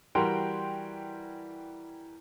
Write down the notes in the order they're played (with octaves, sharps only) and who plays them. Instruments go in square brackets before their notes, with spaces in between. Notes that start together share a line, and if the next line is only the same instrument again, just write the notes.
[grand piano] E3 G3 F#4 A#4 G5 C6